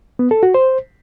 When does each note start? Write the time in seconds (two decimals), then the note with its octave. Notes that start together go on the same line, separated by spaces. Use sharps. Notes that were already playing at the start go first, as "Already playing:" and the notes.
0.19 B3
0.31 A4
0.43 F#4
0.54 C5